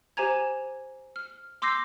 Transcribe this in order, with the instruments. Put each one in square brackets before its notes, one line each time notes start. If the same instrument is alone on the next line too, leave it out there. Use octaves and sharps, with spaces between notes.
[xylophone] G4 C5 G#5 A#5 G#6
F6
C6 D6 E6 G6 A#6 C7